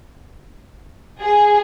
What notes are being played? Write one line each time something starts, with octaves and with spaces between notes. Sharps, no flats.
G#4